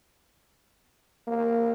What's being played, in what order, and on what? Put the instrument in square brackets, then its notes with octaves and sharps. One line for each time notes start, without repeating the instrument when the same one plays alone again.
[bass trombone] A#3